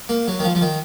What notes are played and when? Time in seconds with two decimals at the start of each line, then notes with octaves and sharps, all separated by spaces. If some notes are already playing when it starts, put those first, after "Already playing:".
0.09 A#3
0.28 F#3
0.39 D#3
0.44 F3
0.55 F3
0.61 D#3